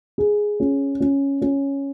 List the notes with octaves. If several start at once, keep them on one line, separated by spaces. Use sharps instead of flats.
G#4
C#4
C#4
C#4